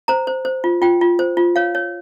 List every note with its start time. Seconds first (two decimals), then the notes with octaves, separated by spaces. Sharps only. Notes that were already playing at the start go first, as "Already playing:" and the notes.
0.08 C5 A#5
0.27 C5
0.45 C5
0.64 F4
0.82 F4 G5
1.01 F4
1.19 C5
1.37 F4
1.56 C#5 F5
1.75 C#5